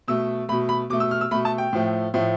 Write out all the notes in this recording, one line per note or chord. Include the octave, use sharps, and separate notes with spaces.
B2 A3 E6
B2 A3 B5
B5
B2 A3 D6
E6
F6
E6
B2 A3 B5
A5
G5
A2 F3 A3
A2 F3 A3